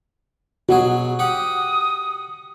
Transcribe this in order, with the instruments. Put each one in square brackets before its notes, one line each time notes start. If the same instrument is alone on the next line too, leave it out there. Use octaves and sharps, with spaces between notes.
[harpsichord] B2 F#3 G#4 [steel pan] F#4
[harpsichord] G4 F#5 [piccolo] D#6